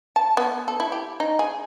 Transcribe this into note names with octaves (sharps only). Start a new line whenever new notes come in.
A5
B3
A4
E4
G4
D#4
G#4